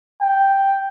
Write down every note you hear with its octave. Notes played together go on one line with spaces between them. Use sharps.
G5